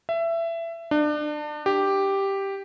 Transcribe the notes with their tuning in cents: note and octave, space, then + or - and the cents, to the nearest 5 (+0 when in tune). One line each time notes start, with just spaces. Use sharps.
E5 +20
D4 +30
G4 +0